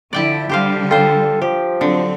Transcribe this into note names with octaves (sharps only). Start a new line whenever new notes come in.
D3 F3 E4 D5 G5 A5
D3 G3 G4 C5 F5
F4 A4 C5 G5
F3 G4
D3 F#3 C4